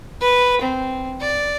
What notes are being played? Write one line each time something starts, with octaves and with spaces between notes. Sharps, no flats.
B4
C4
D5